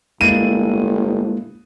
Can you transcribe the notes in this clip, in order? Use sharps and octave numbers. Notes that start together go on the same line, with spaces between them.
G1 G#3 A#3 E4 D#7